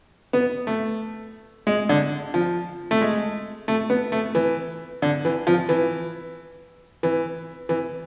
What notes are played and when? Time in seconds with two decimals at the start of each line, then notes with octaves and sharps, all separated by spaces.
0.33 B3
0.67 A3
1.67 G#3
1.89 D3
2.34 F3
2.91 A3
3.01 G#3
3.68 A3
3.90 B3
4.12 A3
4.35 E3
5.02 D3
5.25 E3
5.47 F3
5.69 E3
7.03 E3
7.69 E3